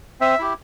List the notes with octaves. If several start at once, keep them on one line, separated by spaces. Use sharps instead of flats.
C4 E5
E4 G4